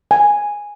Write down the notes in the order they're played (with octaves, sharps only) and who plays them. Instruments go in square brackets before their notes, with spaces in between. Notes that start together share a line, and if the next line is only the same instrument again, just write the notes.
[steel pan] G#5